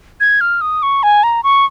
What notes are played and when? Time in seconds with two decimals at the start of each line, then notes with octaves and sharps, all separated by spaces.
0.20 G#6
0.41 F6
0.61 D#6
0.83 C#6
1.03 G#5
1.23 A#5
1.43 C#6